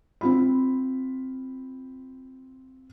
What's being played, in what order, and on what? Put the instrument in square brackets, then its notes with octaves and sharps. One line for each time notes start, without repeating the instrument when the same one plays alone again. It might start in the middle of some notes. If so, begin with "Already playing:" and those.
[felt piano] C4 F4 B5